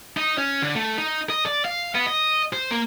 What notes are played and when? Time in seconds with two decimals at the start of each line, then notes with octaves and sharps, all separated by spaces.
0.17 D#4
0.38 C#4
0.62 D3
0.75 A3
0.98 D#4
1.30 D#5
1.46 D5
1.65 F5
1.95 B3
2.06 D#5
2.53 C5
2.71 A#3